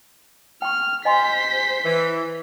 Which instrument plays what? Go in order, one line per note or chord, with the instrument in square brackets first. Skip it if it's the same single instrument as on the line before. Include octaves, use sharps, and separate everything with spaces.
[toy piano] G5 C#6 [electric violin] F6
[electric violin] C5 B6 [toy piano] D#5 G#5 C6
[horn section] E3